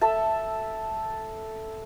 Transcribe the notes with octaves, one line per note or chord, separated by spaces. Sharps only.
A4 E5 A5